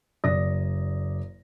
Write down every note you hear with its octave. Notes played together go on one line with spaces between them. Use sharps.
F#1 D5 D#6 A#6